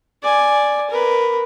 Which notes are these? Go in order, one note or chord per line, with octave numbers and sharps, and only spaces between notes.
D5 G#5
A#4 B4